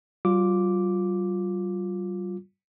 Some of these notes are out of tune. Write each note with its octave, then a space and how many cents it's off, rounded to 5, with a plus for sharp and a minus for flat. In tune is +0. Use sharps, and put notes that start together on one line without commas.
G3 -40 F4 +15 D6 +0